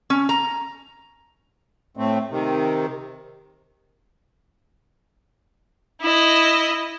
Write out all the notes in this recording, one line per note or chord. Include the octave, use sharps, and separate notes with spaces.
C#4
A#5
A2 A3 C4
C3 D#3
E4 D#5